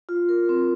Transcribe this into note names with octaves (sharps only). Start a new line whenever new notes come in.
F4
A#4
C4